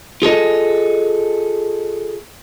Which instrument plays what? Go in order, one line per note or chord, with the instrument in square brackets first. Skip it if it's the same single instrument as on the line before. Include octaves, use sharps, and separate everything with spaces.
[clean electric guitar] F4 G#4 A4 D#5